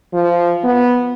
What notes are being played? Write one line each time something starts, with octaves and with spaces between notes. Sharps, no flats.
F3
B3